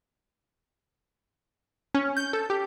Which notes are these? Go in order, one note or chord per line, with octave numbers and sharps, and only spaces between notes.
C#4
G6
A4
G4